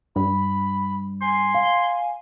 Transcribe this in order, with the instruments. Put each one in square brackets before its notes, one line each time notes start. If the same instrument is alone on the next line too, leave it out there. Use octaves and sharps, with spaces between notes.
[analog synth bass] G2 [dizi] B5
[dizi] G#5 [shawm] C6
[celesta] F5